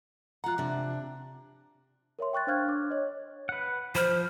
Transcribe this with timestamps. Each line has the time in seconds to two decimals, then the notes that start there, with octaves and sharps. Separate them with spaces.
0.44 F4 F#5 A#5 F#6
0.58 C3 D4
2.19 A#4 C#5 E5 C6
2.33 G5 C#6 F#6 A6
2.47 D4 C5 F5 F6 F#6 G#6
2.68 D4 D6
2.90 C#5 D#5
3.49 B4 F#5
3.95 F3 C5 B5 F6